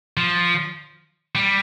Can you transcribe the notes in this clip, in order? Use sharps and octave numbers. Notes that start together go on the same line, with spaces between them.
F3
G3